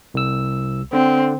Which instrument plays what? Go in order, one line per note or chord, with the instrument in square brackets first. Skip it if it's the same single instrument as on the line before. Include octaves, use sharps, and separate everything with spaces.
[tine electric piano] C2 E6
[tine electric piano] D3 [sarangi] C4